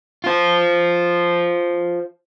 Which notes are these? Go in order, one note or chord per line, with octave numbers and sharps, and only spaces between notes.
F4 C5